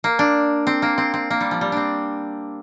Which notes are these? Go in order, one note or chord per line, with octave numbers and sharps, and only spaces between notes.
A#3
D4
C4
A#3
C4
C4
A#3
G3
F3
G3
C4 D4